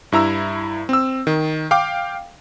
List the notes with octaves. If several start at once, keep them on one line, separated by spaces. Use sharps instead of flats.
G2 E4 A#5 E6
C4 E6
D#3
F5 G5 D6